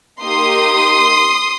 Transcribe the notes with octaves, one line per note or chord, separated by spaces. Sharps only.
A#3 D#4 G4 C6 D#6